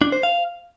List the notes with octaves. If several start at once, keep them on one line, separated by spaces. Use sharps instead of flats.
D4
C5
F5